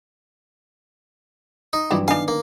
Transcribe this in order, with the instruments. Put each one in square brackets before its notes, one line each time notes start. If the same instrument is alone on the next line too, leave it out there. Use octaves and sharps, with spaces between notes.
[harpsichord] D#4
[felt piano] G2 E3 F#3 [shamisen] C4 D4 E4
[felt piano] D3 D#3 B3 [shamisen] D4 G#5 [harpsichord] F5
[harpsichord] A#3